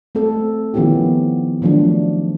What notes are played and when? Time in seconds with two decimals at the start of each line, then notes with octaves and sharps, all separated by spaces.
0.15 A3 C4 A4
0.74 D#3 F3 B3 C#4 E4 G4
1.62 D#3 F3 F#3 A3 D4